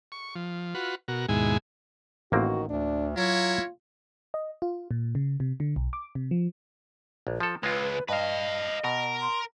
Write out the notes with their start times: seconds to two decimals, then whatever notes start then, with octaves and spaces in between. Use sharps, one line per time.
0.12 C#6
0.35 F3
0.74 F4 F#4 B4
1.08 B2 F#4 A#4
1.29 D#2 G#2 B2 G#3 E4 G#5
2.32 A1 D#3 A#3 C4 F#4
2.70 D2 D4
3.17 F#3 E4 F4 A#4 C#5
4.34 D#5
4.62 F4
4.91 A#2
5.15 C#3
5.40 C3
5.60 D3
5.76 B1
5.93 D6
6.15 C3
6.31 F3
7.27 A#1
7.40 F3 A4
7.63 C#2 G#3 F4 B4
8.09 G2 B4 D#5 F5
8.84 B2 A#4
9.21 C6